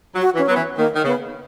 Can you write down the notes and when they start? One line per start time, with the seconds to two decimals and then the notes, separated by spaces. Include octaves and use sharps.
0.15 F#3
0.21 F#4
0.35 E3
0.39 C#4
0.47 F#3 B3
0.56 E3
0.78 D#3 A#3
0.95 D#3
1.04 C#3 B3